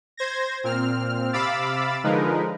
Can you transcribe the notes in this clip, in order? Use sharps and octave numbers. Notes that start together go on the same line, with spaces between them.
C5 G#6 A#6
A#2 C4 F6
C3 F5 B5 D6 E6 A6
D3 F3 G#3 D#4 A#4 B4